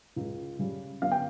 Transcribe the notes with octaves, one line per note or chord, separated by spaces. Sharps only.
C#2
C#3 G3 C#4
G1 F5
G5